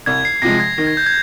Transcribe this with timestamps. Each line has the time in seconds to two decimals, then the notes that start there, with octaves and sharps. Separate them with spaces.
0.06 C2 G#6
0.25 C7
0.42 C3 F3 G#3 A#6
0.60 G#6
0.78 D#3 A#6
0.87 G#6
0.97 G6
1.06 G#6